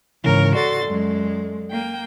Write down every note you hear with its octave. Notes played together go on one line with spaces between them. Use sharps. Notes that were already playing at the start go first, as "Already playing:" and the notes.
G#2 C#3 E3 A#4 C#5
F#4 A4 D5 C6 A6
F#2 G#3
A#3 G5